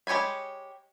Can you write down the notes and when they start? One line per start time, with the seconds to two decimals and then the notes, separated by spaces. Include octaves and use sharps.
0.07 G#3 G4 C#5 G#5 B5